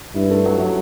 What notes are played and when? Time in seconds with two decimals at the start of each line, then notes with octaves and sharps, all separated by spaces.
0.15 G2 E4
0.30 A3
0.46 F#3
0.60 F#3